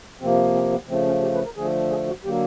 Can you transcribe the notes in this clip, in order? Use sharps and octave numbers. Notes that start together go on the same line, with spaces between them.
C3 F3 A#3 C4
C4
B3
C#3 F3 A3 C4
C#4
G4
B4
A#4
D3 F3 A3 G#4
G#4
F#4
D3 F#3 A#3 G4